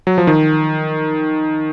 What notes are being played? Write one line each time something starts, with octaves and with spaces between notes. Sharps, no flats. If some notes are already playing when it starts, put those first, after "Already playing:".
F#3
F3
D#3